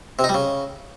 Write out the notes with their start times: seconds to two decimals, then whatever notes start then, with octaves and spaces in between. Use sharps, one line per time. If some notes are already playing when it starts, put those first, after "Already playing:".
0.19 C3
0.24 D#4
0.29 G3
0.34 C#3